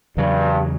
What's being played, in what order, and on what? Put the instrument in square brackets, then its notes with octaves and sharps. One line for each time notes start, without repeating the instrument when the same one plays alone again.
[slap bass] E2 C#3 F#3 [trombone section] G2